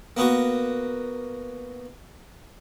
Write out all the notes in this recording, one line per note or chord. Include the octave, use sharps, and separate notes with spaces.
A#3 B3 F#4